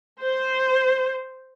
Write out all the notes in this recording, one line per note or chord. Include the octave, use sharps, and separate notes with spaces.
C5